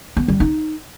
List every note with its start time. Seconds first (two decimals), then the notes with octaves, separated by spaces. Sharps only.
0.17 B3
0.28 G3
0.40 D#4